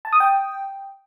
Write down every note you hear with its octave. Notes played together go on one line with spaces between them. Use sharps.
A5
D#6
G5